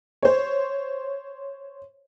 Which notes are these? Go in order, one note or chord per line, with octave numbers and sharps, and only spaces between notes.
C5 C#5